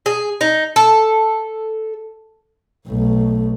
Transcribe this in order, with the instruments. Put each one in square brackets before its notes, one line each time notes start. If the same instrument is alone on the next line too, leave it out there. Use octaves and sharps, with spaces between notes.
[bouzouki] G#4
D#4
A4
[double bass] B1 A3